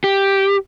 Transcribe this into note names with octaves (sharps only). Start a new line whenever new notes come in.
G4